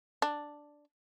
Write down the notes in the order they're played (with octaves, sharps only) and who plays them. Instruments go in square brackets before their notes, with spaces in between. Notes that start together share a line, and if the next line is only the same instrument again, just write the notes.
[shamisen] D4